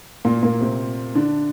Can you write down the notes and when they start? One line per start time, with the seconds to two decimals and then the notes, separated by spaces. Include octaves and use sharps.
0.25 A#2 A#3
0.43 A#2 A#3
0.61 C3 C4
1.15 D3 D4